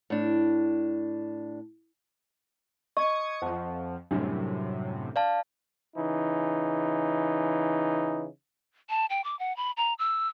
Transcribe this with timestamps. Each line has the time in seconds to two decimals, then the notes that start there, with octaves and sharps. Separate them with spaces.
0.10 A2 D4
2.97 D#5 C#6 D#6 G#6 C#7
3.42 F2 F3 C5 F#5 A5
4.11 F#2 A2 C3 F#3 G3 D4
5.16 D5 F5 A5
5.96 C#3 E3 D#4
8.89 A5
9.10 G5
9.24 D6
9.39 F#5
9.57 B5
9.77 A#5
9.99 E6